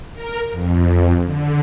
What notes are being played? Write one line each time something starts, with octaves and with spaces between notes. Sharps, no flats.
A#4
F2
D3